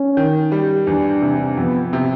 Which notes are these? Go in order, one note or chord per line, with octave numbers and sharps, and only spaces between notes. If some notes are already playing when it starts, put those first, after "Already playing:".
Already playing: C#4
D#3
G3
E2 D4
C3
F2 B3
C3